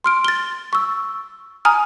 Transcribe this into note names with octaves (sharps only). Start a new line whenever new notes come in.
C6 F6 D7
A6 G7
C#6 E6
G#5 A#5 D#6 F6